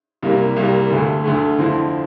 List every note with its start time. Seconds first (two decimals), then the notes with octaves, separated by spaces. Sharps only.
0.22 C2 C3 G3 A#3
0.56 C2 C3 G3 A#3
0.90 D2 D3 A3
1.24 D2 D3 A3
1.59 F2 D3 F3 C4 E4